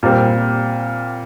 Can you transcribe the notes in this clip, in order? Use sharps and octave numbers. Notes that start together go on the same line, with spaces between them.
A#2 G3 C4